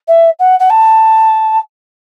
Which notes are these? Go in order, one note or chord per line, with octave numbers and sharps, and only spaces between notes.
E5
F#5
F#5
A5